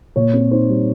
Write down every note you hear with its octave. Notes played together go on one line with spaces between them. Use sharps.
A#2 C#5
C4
D#4 C5
G3